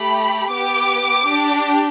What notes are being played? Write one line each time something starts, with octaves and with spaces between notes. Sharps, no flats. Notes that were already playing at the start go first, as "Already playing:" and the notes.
Already playing: A3 G4 B5
B3 G4 D6
D4 G4